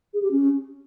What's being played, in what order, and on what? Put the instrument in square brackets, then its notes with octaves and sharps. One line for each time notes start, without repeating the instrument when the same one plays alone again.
[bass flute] G#4
G4
C#4